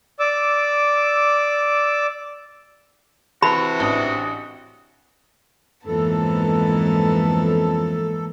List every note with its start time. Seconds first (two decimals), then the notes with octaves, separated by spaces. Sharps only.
0.20 D5 D6 E6
3.42 C3 E3 F#4 A5 B5
3.80 A1 D4 D#6
5.87 F2 G#2 E3 A#3 B3 A4 A5